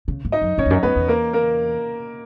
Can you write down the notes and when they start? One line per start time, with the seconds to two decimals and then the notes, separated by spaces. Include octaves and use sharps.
0.08 C#3
0.25 G#2
0.32 D#4 D#5
0.42 F#2
0.58 G#2 C#4 C#5
0.66 E2
0.70 F#2
0.83 F#2 B3 B4
0.96 E2
1.08 A#3 A#4
1.33 A#3 A#4